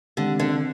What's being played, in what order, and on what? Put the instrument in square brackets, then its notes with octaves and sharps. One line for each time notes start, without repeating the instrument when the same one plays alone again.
[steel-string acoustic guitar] D3 [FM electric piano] D#3 G#3 C4 G4
[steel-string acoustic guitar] D3